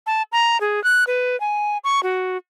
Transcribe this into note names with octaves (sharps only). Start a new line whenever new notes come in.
A5
A#5
G#4
F#6
B4
G#5
C#6
F#4